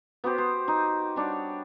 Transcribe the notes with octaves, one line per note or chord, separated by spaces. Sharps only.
B3 F#4 G4 C5
C5
D#4
G3 D4 C#5 F#5